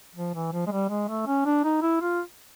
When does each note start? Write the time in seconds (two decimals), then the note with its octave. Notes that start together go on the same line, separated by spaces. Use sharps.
0.15 F3
0.35 E3
0.53 F3
0.67 G#3
0.72 G3
0.90 G#3
1.09 A3
1.27 C#4
1.46 D4
1.64 D#4
1.82 E4
2.01 F4